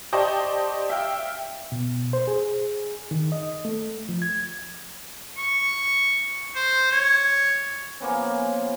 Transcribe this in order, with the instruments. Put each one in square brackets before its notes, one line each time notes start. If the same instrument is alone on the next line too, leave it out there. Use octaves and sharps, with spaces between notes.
[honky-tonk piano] G4 C5 D5 D#5 A5 C#6
E5 F5 G5
[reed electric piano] B2
C5
G#4
D#3
D#5
A3
F3
G#6
[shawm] C#6
C5
C#5
[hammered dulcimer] F3 A#3 B3 C#4